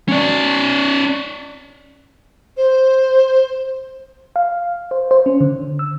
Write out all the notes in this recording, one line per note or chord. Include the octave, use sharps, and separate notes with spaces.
C#4 D5
C5
F5
C5
C5
C#4
D3
E6